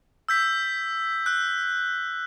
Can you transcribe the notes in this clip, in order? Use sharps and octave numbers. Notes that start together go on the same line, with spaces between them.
E6 G6 B6
E6 F#6